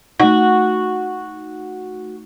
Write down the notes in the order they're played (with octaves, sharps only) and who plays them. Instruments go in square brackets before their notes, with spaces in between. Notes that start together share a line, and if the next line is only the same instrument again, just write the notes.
[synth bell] A3 D#4 [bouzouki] F#4